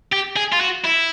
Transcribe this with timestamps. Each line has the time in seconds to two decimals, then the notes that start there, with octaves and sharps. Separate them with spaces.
0.13 G4
0.37 G#4
0.53 F4
0.61 F#4
0.85 E4